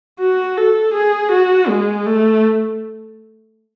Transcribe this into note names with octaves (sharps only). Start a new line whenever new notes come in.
F#4
A4
G#4
F#4
G#3
A3